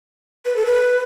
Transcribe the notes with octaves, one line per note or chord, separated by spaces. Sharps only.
B4
A4
B4